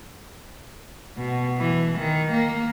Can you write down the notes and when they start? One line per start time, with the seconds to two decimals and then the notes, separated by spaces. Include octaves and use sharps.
1.18 B2
1.59 E3
1.98 D#3
2.31 A#3